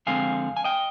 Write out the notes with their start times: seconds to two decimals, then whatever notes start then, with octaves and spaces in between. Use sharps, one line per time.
0.07 F2 D3 G#3 C4 F5 G#5
0.57 G#5
0.64 D#5 G5